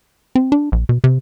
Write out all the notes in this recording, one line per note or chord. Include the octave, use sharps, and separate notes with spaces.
C4
D4
A#1
B2
C3